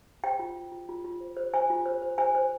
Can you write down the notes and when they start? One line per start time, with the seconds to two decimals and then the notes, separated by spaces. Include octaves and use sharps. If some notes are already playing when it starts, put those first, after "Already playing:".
0.24 C5 G5
0.39 F4
0.56 F4
0.72 F4
0.89 F4
1.04 F4
1.20 C5
1.37 C5
1.54 C5 G#5
1.70 F4
1.86 C5
2.02 C5
2.18 C5 G#5
2.35 C5